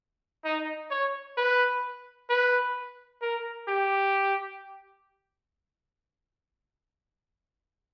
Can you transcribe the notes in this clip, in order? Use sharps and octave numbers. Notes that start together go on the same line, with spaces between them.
D#4
C#5
B4
B4
A#4
G4